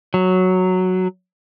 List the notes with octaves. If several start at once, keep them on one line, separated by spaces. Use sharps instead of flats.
F#3